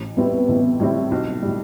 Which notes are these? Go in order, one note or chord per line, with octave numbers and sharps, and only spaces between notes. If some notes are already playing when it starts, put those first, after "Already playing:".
Already playing: A1
A2 G3 B3 C4 E4
A1
A2 G3 C4 E4
B1
A2 G3